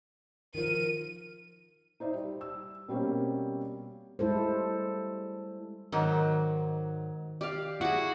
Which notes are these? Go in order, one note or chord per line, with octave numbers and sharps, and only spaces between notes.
D#3 F3 A#4 D#7
D#4 C5 D5 E5
G3
E6
B2 G3 A#3 C4 C#4
G3 G#3 E4 A4 C5
G#2 D#3 F#3
G4 D5 F5
E4 F#4 G#4